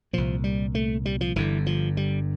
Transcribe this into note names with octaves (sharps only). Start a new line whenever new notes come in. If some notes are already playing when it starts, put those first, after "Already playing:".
C2 A#2 F3
G3
A3
G3
F3
G1 G2 D3 E3
F3
G3